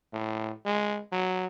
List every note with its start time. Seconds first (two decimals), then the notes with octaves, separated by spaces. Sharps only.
0.13 A2
0.66 G#3
1.12 F#3